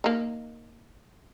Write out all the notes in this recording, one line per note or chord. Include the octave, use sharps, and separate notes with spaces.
A#3 D#4